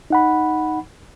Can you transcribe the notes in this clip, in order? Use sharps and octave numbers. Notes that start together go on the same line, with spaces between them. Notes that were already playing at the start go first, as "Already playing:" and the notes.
D#4 F#5 B5